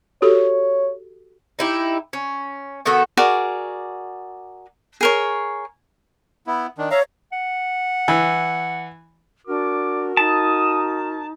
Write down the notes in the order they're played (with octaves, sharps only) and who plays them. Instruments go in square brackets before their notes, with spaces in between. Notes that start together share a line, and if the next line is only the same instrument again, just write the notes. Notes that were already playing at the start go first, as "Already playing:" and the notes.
[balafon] F#4 G4 A4 [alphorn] C#5
[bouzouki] D#4 E4 G4
C#4
D#3 B3 F#4 A4
[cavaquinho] F#4 G#4 A#4 D5
G#4 A#4 C#5
[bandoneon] B3 E4
D#3 D4
[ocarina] C#5 [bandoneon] E5 F5 A#5
[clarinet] F#5
[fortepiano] E3
[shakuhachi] D4 [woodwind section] F#4 A#4 [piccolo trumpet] D6
[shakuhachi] D#4 [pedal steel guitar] A5 [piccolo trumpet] D#6